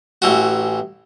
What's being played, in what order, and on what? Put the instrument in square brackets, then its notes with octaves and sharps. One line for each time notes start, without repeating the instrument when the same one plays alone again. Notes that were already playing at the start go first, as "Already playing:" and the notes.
[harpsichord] A1 E3 F#4